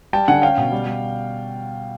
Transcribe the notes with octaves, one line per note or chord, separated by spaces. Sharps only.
G3 G5 A5
D3 F#5 G#5
C#4 F5 G5
B2
G3
G3